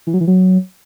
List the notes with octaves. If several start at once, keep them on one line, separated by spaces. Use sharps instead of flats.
E3
F#3
E3
F#3